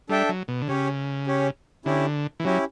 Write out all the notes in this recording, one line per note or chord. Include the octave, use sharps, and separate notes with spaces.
G3 D4 A4 E5 G5
F#3
B2
D3
C#3 C#4 G4 C#5
C#4 G4 C#5
D3 C#4 E4 G4
E3
F#3 C#4 E4 G4